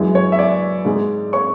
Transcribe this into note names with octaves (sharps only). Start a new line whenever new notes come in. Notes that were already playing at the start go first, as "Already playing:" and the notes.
Already playing: F#2 E3 G#3
C#5
E5
D5
G#2 G#3
C#5 C#6